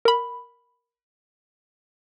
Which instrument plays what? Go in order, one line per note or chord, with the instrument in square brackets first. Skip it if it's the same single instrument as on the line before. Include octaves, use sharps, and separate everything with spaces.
[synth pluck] A#4 B5